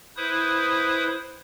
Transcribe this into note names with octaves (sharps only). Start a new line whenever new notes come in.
E4 B4 C5 D#6